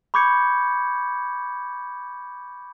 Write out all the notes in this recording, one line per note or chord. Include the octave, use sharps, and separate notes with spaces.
B5 C#6 D6 G6 G#6 C#7